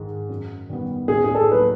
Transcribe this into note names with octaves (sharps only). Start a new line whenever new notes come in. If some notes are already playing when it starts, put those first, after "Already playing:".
Already playing: G#2 D#3 G#3
F#2
D#3 G3 B3
A2 G#4
G#4
A4
F#3 A#3 D#4 B4